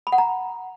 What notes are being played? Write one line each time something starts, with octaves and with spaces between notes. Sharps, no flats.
B5
F#5
A#5